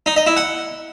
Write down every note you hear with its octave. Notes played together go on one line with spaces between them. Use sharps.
D#4
D#5
E4
F#5